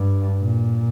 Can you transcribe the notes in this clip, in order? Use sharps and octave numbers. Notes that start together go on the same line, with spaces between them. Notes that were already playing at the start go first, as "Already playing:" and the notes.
Already playing: G2
A#2